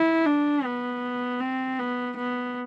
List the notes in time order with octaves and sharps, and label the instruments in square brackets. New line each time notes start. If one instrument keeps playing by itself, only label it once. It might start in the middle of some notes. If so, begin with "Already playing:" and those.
Already playing: [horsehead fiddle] E4
D4
B3
C4
B3
B3